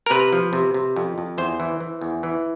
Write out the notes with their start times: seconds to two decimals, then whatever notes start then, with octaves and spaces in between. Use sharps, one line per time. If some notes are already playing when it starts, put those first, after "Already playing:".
0.06 A#4
0.10 C3 B4
0.33 F3
0.53 C3
0.74 C3
0.96 F2
1.18 F2
1.38 E2 C5
1.60 E3
1.80 E3
2.01 E2
2.23 E3